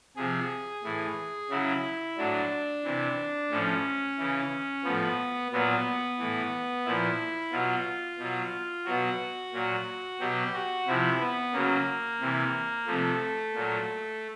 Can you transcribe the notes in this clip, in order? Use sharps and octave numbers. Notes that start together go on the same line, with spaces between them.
C3 F3 G#4
A2 E3
C#3 F#3 E4
A2 F#3 D4
C3 E3
A2 F3 C#4
C#3 E3
A2 F3 B3
A#2 F#3 B3
A2 E3
A#2 F3 E4
B2 F#3 F4
B2 F#3
B2 F#3 F#4
A#2 F#3
B2 F#3 G4
F#4
C3 F3 E4
B3
C#3 F#3 A#3
C3 E3
C3 F3 A3
A#2 F#3